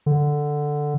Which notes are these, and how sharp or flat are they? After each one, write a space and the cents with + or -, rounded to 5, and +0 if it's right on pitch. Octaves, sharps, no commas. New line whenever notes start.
D3 +5